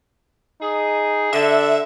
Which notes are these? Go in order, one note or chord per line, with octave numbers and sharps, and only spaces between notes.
D#4 G#4
D3 E5